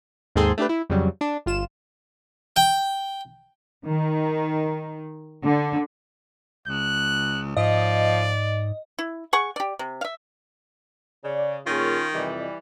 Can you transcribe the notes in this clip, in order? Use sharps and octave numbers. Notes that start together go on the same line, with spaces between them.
D#2 G#2 C4 G#4 A4 C6
A3 D4 G4 B4
E4
F2 C#3 F#3 G3
D4
G1 F4 E7
G5
D#3
D3
C#2 F#6
G#2 F3 D5 D#5
E4
G#4 F#5 C#6
G4 D5
C3
E5 F5
C#3 D5
A#2 D#3 C#4 F4 G#4 A#4
F2 C3 E3 G3 D#5